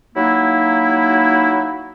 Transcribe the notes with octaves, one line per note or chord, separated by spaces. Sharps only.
F#3 A#3 D#4 E4